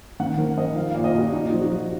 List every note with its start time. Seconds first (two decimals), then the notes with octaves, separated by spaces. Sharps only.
0.20 D#3 F#5
0.38 D#3 A#4
0.57 D#3 D#5
0.75 F3 F5
0.91 A#2 F5
1.04 D#5
1.14 A#2 F#4
1.32 A#2 D#4
1.52 F3
1.61 F#4
1.71 F3